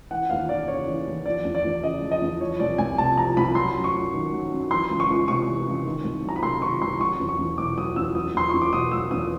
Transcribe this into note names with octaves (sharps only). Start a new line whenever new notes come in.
E3 F#5
D#2 F5
D#2 D5
C#3 C#5
E3
D#2
F3 D5
E2
D5
E2
C#3 D#5
F3
D#5
E2
F3 C#5
C2 D5
C2 G#5
C3 A5
F3 A#5
C2 B5
F#3 C6
F#2
C#6
F#2
D#3
F#3
F#2
E3 C6
C#2
C#6
C#2
C3 C#6
E3
C#2
D#3
C2
F#3
A#5
B5
C3 C6
D#3 C#6
C2 C6
F#3 C#6
E2
C#6
E2
B2 D6
F#3 D#6
E2 E6
F#3 D#6
E2 C6
E2 C#6
D6
B2 D#6
F#3 E6
E2 D#6